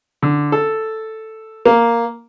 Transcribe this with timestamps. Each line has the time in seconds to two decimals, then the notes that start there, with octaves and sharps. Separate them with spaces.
0.22 D3
0.52 A4
1.65 A#3